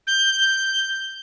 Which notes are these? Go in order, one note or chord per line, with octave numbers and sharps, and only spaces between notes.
G6